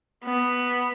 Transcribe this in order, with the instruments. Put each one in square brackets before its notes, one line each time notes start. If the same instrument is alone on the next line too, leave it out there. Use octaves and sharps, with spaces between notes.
[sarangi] B3